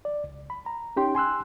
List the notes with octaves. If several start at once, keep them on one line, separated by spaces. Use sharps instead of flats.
D5
C#2
B5
A#5
C#4 D#4 G4 G5 C6
G#5 C6 E6 F#6